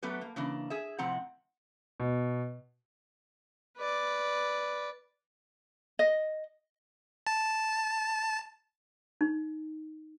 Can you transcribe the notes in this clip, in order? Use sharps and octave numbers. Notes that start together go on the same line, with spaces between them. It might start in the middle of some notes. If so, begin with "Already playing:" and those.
F#3 A3 B3 G4 B4
A#3
C#3 E3 A#3 D4
G#4 E5
A2 C3 F3 C4 F#5 A#5
B2
B4 D5
D#5
A5
D#4